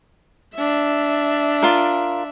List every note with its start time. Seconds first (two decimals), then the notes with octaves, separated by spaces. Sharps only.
0.55 D4 E5
1.62 F4 A#4